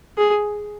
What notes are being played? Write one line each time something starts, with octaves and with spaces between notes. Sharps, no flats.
G#4